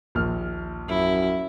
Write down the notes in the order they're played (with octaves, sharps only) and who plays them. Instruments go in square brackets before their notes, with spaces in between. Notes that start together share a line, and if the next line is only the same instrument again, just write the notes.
[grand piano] A#1 D#2 F6
[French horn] F#2 [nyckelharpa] E4